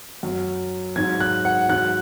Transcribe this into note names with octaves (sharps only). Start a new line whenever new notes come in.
F#2 F#3
G#2 F#3 G#6
F#6
F#5
G#2 F#3 F#6